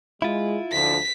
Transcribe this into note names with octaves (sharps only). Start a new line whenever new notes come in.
G#3 E4 F4
D2 D3 F3 B6